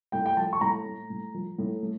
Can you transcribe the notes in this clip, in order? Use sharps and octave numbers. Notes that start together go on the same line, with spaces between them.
A2 G5
G5
F3 A5
C#6
A2 A#5
A3
A2
F3
A2
A3